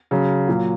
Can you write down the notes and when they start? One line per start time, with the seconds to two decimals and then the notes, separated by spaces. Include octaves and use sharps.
0.11 C#3 F#3
0.48 A#2 F#3